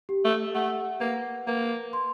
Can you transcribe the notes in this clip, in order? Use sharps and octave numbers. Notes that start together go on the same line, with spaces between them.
G4
A3
A3 F#5
A#3 B4
A#3 B4
C6